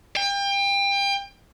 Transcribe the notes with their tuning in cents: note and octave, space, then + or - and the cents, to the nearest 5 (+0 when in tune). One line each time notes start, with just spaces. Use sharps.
G5 +30